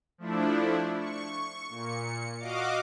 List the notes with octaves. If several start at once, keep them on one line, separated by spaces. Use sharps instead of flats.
F3 A3 D4 E4
C#6
A#2 C#7
F#4 D#5 F5 D6